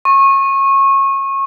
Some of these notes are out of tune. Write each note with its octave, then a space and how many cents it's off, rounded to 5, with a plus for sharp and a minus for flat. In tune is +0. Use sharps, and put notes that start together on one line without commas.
C#6 -25